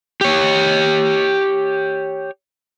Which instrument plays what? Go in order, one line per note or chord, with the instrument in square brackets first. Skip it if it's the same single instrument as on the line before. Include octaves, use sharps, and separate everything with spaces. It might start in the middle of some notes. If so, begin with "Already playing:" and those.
[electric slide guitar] G4 C#5